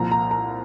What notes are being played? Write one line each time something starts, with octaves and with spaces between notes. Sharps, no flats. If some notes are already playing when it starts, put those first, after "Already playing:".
Already playing: C2 A#2 F3 A#5
A#5
A#5